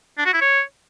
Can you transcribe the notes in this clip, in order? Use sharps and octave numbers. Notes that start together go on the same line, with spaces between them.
D4
F#4
E4
C#5